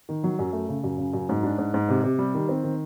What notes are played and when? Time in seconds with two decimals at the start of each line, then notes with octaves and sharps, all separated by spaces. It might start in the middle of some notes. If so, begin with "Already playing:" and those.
0.09 D#3
0.24 F#3
0.39 F#2
0.53 A3
0.69 C#3
0.84 F#2
0.98 C#3
1.13 F#2
1.29 G#2
1.43 D4
1.58 G#2
1.74 G#2
1.89 C3
2.04 C3
2.19 G3
2.34 D#3
2.49 C4
2.63 D#3